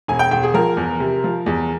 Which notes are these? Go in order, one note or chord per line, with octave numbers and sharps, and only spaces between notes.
E1 G#5
G5
E1 G5
G#4
F3 A#4
E2
C3
F3
E2